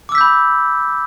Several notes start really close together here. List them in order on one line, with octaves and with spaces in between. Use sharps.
D6 E6 B6 G6 B5